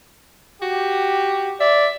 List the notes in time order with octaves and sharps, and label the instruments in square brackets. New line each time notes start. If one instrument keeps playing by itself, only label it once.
[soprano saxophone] F#4 [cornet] G4
[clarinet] D5 [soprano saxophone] E5